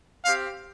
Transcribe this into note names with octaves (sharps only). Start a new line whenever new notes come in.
C4 G4 F5